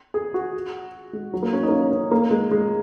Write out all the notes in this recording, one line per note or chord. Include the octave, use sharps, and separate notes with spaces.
G#4
F#4
G#3
F#3
A#3
C#4
D#4
A#3
C#4
C#4
A#3
G#3
G#3